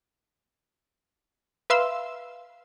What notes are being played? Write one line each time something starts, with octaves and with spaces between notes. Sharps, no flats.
B4 E5 F5 C6 E6